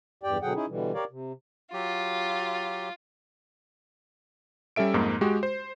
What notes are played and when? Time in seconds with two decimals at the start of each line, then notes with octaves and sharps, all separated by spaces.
0.23 E2 G2 G4 D5 G5
0.42 B2 D3 F#3 G#4 F#5 G5
0.55 C#4 D#4 E4 G#4
0.68 B2 D3 E3 G3
0.94 G4 A#4 C#5 D5 F5
1.10 C3
1.73 F#3 F4 G4
4.76 G3 C#4 A4 E5 D7
4.94 F2 G#2 A#3 D#4
5.21 G#3 F#4 G4
5.43 C5